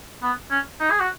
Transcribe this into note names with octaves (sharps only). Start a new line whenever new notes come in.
B3
C#4
D#4
G#4
F#4